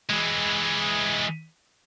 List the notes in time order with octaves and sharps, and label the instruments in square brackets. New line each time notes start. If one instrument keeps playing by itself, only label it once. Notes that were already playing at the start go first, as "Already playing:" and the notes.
[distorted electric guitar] E3 G#3